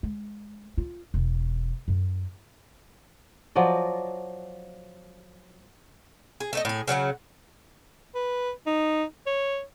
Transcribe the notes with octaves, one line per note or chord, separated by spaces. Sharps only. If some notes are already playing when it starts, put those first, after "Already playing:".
G#3
F4
E1
F#2
F3 F#3 D5 D#5
G#4
A3 D#4 D#5
A2 G#4
C#3 F#3 A#4 F#5
B4
D#4
C#5